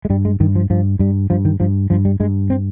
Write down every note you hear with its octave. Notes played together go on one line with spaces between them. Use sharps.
G#3
G2 G3
G#3
G2 D#3
F3
G2 F3
G2 G3
G2 F3
D#3
G2 F3
G2 F3
G3
G2 G#3
C4